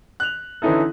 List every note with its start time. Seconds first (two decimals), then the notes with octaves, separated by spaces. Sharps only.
0.20 F#6 F7
0.62 D3 E3 C#4 D#4 E4 A4